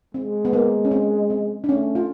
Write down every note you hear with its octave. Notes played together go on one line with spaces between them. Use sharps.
G#3 C4
B3
A#3
C#4
C4
C4
D4
A3 C#4
F4